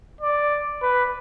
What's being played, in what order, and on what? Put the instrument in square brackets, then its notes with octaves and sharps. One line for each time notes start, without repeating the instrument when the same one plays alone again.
[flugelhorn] D5
B4